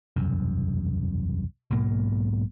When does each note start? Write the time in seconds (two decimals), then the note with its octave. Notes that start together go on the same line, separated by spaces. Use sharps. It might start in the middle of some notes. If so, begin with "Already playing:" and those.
0.16 E1 C2 F#2
1.71 B1 G#2 B2 A#3